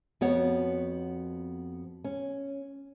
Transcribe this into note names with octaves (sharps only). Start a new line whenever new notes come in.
F2 B3 F#4 C#5 F#5
C#4